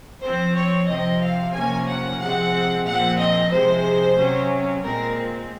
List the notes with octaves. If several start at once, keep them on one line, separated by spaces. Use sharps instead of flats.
F3 C4 C5
C#5
C3 F3 C4 D#5
F5
C3 F3 A#3 C#4 G#5
F#5
C3 F3 G#3 C4 F#5
A#2 F3 C4 F#5
D#5
C3 F3 G#3 C5
C3 F#3 C#4
A#2 G#3 C4 A#4